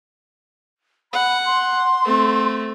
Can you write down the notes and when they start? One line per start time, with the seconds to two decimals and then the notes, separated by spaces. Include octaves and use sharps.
1.13 F#5 B5
1.45 C6
2.05 A3 C4